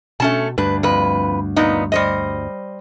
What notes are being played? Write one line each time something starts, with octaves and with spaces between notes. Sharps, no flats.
B2 A3 C#4 A5
D2 G2 D4 B4
F2 B4
A#2 B3 D#4
G3 C5 D#5